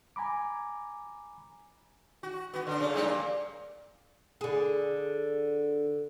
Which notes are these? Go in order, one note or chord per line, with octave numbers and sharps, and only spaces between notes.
G#5 A#5 B5 D6
F#4
B3 F#4
D3 D4
C#3 A3
G#2 G3 A#3
A#3
D3 G#4